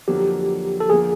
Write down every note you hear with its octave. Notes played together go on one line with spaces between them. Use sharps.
F2 D3 F#3 A#3 G4
A4
F2 D3 F3 A#3 G#4